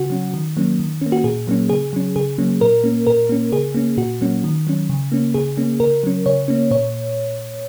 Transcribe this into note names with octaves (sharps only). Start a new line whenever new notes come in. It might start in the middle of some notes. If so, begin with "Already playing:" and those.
Already playing: C#3 F#4
F#3 C#4
D#3
F#3 A#3 C#4
D#3
A#3 C#4
F#4
A#2 G#4
F#3 A#3 C#4
C#3 G#4
F#3 C#4
C#3 G#4
F#3 A#3 C#4
A#2 A#4
A#3 C#4
A#2 A#4
A#3 C#4
C#3 G#4
A#3 C#4
A#2 F#4
F#3 A#3 C#4
D#3
F#3 C#4
C#3
A#3 C#4
C#3 G#4
A#3 C#4
C#3 A#4
F#3 C#4
C#3 C#5
A#3 C#4
A#2 C#5